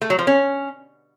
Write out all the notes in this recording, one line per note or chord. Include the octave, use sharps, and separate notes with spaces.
A3
F#3
F3
C#4